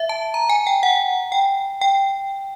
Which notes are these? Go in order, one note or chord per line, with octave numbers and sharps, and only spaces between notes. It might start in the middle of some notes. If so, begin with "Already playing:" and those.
Already playing: E5
A5
A#5
G#5
G5
F#5
G5
G5